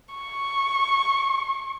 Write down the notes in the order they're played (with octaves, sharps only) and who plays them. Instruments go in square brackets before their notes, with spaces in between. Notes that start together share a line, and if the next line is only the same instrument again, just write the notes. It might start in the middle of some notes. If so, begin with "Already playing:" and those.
[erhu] C#6